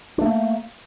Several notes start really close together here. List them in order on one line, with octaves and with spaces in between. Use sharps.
D4 A3 A#3